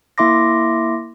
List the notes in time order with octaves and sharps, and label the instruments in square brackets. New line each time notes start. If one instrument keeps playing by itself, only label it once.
[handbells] A#3 E4 E5 C6 D6 A#6